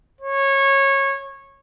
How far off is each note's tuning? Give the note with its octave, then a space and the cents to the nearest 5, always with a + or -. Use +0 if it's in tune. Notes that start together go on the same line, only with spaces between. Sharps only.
C#5 -20